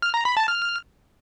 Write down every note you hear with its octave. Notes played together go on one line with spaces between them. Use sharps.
F6
A#5
B5
A5
F6